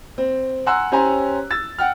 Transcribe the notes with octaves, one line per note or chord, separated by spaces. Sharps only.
C4
F#5 G#5 A#5 C6 E6 F#6
C#4 G4 C5 C#5 G#5 A#5
E6 A6
F#5 G5 F6